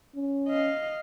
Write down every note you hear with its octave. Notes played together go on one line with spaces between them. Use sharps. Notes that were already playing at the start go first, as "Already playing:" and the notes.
C#4
D#5 F5